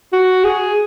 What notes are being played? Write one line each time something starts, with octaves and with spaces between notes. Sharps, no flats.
F#4
G#4